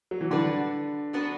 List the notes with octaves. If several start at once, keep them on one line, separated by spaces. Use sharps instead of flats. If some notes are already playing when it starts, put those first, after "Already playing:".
F#3
E3
D3 G3 D4 F#4 B4
F#3 B3 D4 F#4 B4